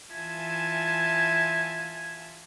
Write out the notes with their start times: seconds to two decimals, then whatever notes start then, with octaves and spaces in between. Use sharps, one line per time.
0.14 E3 F4 E5 G#5 A5 G#6